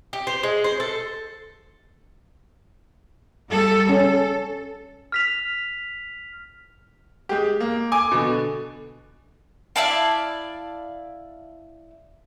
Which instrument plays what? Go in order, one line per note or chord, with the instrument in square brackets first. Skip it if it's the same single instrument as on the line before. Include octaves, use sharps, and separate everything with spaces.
[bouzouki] G4
C5
G#3
C5
A4
[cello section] G3 A4
[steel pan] C#4 [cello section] A4
[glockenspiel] F6 B6 F7
[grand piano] G#3 G4
A#3
G#5 D6
B2 D3
[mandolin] E4 D5 F5 A5